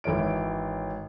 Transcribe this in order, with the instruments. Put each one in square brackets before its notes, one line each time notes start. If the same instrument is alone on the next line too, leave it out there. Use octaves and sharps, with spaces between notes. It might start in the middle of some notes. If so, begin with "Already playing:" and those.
[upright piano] G#1 E3 C#5 D7